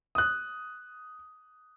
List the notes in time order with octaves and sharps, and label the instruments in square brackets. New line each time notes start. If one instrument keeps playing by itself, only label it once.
[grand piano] D#6 F#6